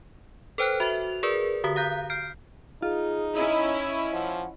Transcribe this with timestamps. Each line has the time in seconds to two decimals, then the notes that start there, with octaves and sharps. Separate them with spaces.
0.58 A4 B4 C5 G5 F6 F#6
0.80 F#4 E5 F7
1.23 G#4 A#4 B4 D5
1.64 D3 F#4 D#6 B6
1.76 F5 A#5 F#6 G6 B6
2.10 F6 G6 C7 D7
2.82 D#4 F4 G#4
3.37 C#4 E4 D#5
3.81 C#6
4.13 F3 F#5